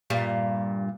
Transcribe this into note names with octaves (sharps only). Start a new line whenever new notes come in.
G2 A#2 G3